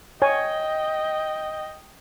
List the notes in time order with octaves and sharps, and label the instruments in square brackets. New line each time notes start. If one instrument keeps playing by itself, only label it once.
[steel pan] C#5 G#5 [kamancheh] D#5 G5